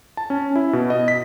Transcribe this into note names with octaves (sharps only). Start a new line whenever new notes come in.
A5
C#4
E4
B2
D#5
B6